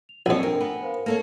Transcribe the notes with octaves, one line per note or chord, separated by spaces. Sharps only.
F7
A#1 F2 G#4 C#5 E6
D4 A#4 G5
B3 F#5 G#5
A#4 C5 F5
A#3 A4 C#5